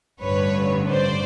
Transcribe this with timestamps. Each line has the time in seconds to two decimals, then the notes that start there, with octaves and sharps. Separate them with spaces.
0.22 A1 G2 D3 B4 C#5
0.90 C5 D5